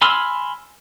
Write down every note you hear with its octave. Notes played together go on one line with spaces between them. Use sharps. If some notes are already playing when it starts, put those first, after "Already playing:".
G#5 B5 C6 E6 F6